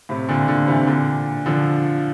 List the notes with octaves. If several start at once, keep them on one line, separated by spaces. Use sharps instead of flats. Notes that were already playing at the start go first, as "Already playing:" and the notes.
A2 C3
A#2 D3
A#2 D3
C3 E3
A#2 D3
D3 F3